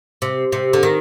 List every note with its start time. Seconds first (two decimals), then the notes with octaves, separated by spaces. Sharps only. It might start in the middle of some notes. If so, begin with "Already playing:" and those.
0.22 C3
0.52 C3
0.73 D3
0.83 D#3